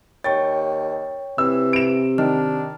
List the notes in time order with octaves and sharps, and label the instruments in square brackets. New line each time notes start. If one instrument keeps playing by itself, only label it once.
[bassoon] D#2 [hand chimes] C#5 G5 C#6 [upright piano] A6
[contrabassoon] C3 [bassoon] E3 [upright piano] E6
[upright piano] D7 E7
[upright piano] D#3 [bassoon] D4 [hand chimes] F6